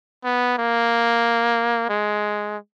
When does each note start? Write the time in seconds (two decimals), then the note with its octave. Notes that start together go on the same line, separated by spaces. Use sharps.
0.24 B3
0.58 A#3
1.89 G#3